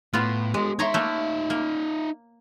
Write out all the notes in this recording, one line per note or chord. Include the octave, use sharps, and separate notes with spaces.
A2 B3 F4
G#3 G4 A4
D#4 C#5 E5 A#5 C6
A3 A#3
A#3